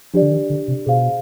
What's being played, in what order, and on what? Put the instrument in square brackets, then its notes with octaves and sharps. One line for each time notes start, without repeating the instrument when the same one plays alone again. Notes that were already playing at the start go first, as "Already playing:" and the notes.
[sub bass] F3 [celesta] D4 G4 D5
[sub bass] D3
D#3
D3
C3
[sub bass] B2 [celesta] G#4 C5 F5